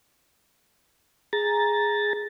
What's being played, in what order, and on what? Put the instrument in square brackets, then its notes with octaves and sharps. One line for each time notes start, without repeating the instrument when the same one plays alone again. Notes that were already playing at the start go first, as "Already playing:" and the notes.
[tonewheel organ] G#4 A#5 A6